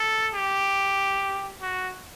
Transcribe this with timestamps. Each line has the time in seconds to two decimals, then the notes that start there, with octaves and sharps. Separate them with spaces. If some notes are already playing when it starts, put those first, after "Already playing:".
Already playing: A4
0.35 G4
1.62 F#4